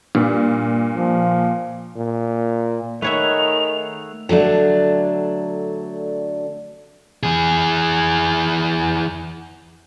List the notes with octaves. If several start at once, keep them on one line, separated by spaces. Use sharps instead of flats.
G2 A#2
F3
A#2
D#3 A3 G#4 B4 C#5 E5 F#5 F7
D3 F#3 A3 D4
E3 G#4